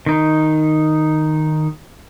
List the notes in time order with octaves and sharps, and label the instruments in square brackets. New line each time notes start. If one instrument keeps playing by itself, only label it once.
[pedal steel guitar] D#3 D#4